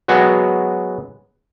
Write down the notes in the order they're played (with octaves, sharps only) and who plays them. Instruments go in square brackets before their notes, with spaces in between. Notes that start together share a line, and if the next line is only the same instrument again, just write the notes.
[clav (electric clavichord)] F#3 G#3 B3 F#4